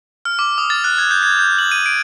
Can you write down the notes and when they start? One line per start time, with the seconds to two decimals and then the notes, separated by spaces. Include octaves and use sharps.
0.25 F6
0.39 D6
0.58 D#6
0.70 A6
0.84 F#6
0.98 G#6
1.11 G6
1.23 G#6
1.39 G6
1.59 F#7
1.71 D#7
1.86 D7